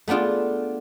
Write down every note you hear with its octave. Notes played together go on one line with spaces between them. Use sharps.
A3 B3 D4 F4 G#4